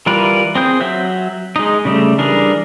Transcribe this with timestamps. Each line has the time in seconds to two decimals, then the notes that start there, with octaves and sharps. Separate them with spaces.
0.06 E3 G3 F4 A#4 B4
0.55 C4 G#4 G6
0.81 F#3 E5 G6
1.56 G#3 D#4
1.85 C#3 G3 A3
2.18 E3 G3 D4 G#4 A#4